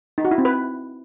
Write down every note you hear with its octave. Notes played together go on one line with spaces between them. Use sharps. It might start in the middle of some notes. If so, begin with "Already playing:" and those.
D#4
F#4
E4
C4
B4